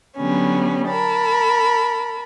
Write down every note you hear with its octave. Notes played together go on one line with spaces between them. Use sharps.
D3 F#3 G3 B3 C#4
A#4 A5 B5